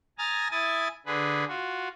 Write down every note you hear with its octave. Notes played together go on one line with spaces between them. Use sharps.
G#5 A#5 D#6 F6 A6
E4 G#5 D#6 A6
D3 G#4 B4
F4 F#4